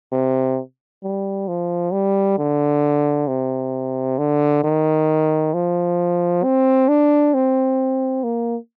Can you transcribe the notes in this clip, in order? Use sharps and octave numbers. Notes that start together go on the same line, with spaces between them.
C3
G3
F3
G3
D3
C3
D3
D#3
F3
C4
D4
C4
A#3